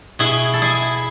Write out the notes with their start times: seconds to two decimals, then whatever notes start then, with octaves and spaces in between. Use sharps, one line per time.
0.19 B2 E4 G#4
0.53 A4
0.62 E4 G#4